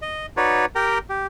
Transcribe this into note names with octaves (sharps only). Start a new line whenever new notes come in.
D#5
D#4 F#4 B4 C#5 D5
G4 A#4 G5 A#5
G4